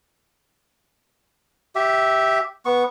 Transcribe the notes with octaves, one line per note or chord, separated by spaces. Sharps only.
G4 E5
B3 C#6